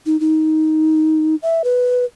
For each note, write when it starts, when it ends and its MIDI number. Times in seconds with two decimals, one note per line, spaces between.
0.06 0.19 63
0.20 1.36 63
1.42 1.62 76
1.64 2.05 71